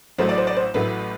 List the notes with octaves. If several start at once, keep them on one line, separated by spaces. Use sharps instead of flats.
A1 A2 F#3 A3 C5
D5
C5
D5
C5
A1 A2 F#3 A3 B4